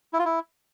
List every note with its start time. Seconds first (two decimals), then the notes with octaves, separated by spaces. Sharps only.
0.13 E4
0.19 F4
0.25 E4